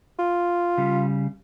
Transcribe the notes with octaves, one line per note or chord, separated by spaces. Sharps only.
F4
C#3 G3